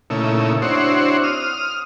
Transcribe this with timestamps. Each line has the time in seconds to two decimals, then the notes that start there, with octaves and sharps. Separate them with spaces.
0.10 A#2 C#3 A3 D#4 E4
0.62 C4 D4 E4 F#4 C5 C#5
1.23 D#6 F6